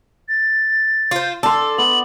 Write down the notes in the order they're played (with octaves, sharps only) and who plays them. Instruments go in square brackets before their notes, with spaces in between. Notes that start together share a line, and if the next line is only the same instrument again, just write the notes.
[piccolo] A6
[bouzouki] F4 C5
[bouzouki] A4 [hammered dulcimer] D5 C6 [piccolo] E6
[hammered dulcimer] B3 [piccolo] F#7